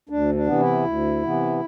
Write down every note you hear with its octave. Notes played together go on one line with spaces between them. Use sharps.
D2 D4
D4
C3 E3 B3
E4
D2
C3 E3 B3